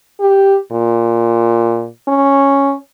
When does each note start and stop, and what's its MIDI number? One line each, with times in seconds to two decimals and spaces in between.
0.21 0.58 67
0.72 1.87 46
2.08 2.75 61